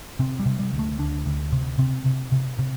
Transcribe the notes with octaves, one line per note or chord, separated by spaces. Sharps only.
C3 C4
G3
C3
G3
D2
A3
D2 D4
D2
C3
C3 C4
C3
C3
C3